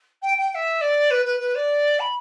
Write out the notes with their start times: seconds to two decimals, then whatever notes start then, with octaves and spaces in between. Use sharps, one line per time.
0.22 G5
0.38 G5
0.51 G5
0.55 E5
0.81 D5
1.11 B4
1.25 B4
1.40 B4
1.55 D5
2.00 B5